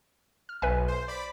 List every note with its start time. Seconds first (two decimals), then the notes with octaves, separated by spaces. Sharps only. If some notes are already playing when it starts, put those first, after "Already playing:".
0.49 F6
0.62 B1 B4 E5 G#5
0.88 C5
1.08 D5 B5